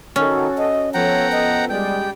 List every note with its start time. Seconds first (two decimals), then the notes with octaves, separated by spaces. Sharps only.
0.16 D#3 C#4 F#4 A4
0.58 D#5
0.94 F3 B3 A4 C#5 F#5 G5 A#5
1.32 D#5
1.70 G3 G#3 D5 G5